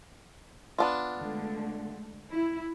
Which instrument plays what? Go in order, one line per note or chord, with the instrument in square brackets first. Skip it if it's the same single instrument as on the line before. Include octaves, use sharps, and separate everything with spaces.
[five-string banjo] B3 D4 F4
[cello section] D3 G#3 A3
E4